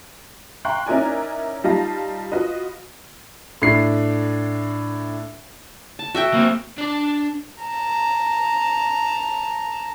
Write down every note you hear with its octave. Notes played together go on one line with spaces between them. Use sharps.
F5 G5 A#5 C6 C#6 F#6
C#4 D#4 E4 A#4 D5 G#5
G3 D#4 F4 F5 A5 A#6
F4 F#4 B4 D#5
A2 D4 C7
A5
F#4 E5 G5
A#3 C4
D4 D5
A5 A#5